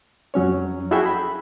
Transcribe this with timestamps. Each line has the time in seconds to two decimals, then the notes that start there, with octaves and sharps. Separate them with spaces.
0.34 F2 F#3 C#4 C#5
0.91 E4 F#4 G#4 A4 E5 G5
1.06 B5